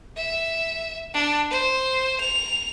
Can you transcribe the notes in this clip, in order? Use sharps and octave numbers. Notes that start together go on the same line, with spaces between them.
E5
D4
C5
F7